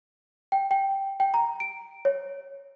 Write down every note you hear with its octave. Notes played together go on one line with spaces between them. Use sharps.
G5
G5
G5
A#5
D7
C#5